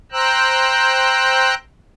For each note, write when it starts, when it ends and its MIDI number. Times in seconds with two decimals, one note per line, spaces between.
0.12 1.54 72
0.12 1.54 79
0.12 1.54 82
0.12 1.54 88
0.12 1.54 90